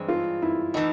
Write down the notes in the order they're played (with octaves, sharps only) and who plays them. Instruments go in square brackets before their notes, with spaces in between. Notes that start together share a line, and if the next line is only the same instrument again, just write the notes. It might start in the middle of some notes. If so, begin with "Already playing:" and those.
Already playing: [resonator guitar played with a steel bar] G2 E3 G#3 C4
[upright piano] F4
E4
[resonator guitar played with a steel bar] A2 E3 [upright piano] D#4